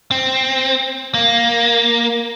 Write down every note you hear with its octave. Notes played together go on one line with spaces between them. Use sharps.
C4
A#3